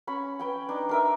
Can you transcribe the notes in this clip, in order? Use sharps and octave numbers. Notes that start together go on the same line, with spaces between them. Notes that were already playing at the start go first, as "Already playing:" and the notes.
C#4 B5
B4 G5 G#5
D4 D#4
D4 A#4 E5